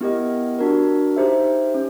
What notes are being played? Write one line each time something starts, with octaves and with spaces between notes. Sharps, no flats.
B3 E4 G4 A#4 D#5
D4 F#4 A#4
D#4 G4 C5 E5
C#4